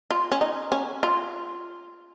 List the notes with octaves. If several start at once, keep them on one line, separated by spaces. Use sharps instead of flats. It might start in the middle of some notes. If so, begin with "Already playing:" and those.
F4
C#4
D#4
C#4
F4